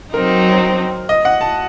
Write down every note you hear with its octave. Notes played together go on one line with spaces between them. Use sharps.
F#3 C4 D#4 A#4
D#5
F#5
A5